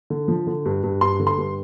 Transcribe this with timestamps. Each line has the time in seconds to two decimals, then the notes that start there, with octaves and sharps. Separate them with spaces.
0.10 D3
0.28 F3
0.47 D3
0.65 G2
0.83 G2
1.01 G2 C6
1.20 D3
1.27 C6
1.38 G2